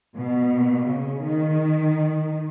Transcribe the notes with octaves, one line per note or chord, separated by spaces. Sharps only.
B2
C#3
D#3